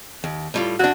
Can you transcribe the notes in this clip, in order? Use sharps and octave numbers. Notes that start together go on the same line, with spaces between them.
D#2
A2 G3 F4
F#2 D4 F#4